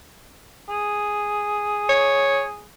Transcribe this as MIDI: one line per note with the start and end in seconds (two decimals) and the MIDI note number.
0.69 2.62 68
1.89 2.44 73